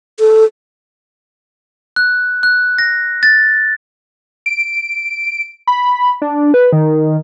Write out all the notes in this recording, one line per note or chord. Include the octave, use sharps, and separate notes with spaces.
A4
F#6
F#6
A#6
A6
D7
B5
D4
B4
D#3